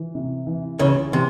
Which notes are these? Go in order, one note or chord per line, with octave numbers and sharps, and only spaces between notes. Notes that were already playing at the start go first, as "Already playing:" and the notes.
Already playing: E3
C3
E3
C#2 C#3 E3
C3 E3